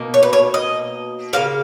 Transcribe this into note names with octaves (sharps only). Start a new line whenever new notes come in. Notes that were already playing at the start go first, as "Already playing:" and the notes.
Already playing: B2 A#3 D#4
C#5
B4
C#5
D#5
C#3 F#3 A#3 F5